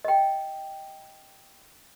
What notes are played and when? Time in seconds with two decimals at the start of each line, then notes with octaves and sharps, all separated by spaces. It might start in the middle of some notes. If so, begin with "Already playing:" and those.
0.05 D#5 G5